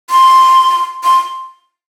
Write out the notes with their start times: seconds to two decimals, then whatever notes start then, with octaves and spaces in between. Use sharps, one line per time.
0.10 C6
1.04 C6